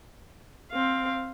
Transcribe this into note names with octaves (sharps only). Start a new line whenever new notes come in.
C4 F5